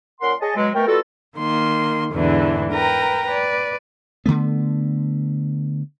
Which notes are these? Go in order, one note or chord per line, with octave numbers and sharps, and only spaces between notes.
A#2 C#4 A#4 F#5 C6
G#4 C#5 D#5 A5
B2 F#3 G#3
B2 A3 A#4 G5
G3 B3 F4 F#4 A4
D#3 A#3 C6
E2 G#2 D3 E3 D4
A#4 B4 G5 A#5
B4 D5
D3 F3 A3 B3